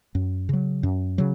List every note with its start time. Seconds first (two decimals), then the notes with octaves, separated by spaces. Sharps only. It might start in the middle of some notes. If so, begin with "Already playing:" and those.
0.15 F#2
0.49 C#3 F#3
0.83 F#2
1.18 C#3 F#3